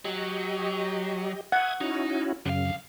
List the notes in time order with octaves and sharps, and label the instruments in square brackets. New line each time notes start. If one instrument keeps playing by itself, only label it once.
[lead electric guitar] F#3 [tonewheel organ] G4 D#5
[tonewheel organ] E5 D#6 G#6 [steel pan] F#5
[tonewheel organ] C#4 E4 F#4 [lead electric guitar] D#4
[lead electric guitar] C2 F5 [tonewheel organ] F#2 C#3